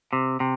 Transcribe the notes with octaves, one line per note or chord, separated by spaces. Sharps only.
C3
C3